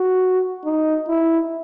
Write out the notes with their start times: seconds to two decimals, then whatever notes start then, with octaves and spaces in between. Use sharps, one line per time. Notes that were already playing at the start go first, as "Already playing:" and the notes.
Already playing: F#4
0.65 D#4
1.08 E4